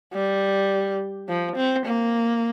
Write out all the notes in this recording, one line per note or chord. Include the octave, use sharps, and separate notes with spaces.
G3
F3
C4
A#3